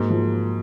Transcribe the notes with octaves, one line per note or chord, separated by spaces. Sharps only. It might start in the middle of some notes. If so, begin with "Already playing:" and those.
Already playing: G#2 F#3 A#3
F3 G#3